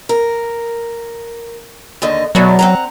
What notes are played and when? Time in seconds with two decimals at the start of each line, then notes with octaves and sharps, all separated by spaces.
0.09 A#4
2.02 D#2 D3 D#5
2.35 E2 B2 F#3 D4
2.59 C4 F#5 A#5